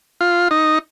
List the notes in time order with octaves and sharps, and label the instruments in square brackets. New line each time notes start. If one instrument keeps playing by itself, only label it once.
[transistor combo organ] F4
D#4